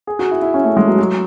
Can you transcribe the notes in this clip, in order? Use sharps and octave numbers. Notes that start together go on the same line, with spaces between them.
G#4
F#4
E4
E4
C#4
A3
G#3
F#3
F#3